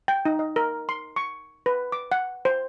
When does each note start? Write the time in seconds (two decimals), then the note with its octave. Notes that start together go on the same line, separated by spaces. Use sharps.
0.08 G5
0.25 D#4
0.39 D#5
0.56 A#4
0.89 C6
1.16 C#6
1.66 B4
1.92 D6
2.12 F#5
2.45 C5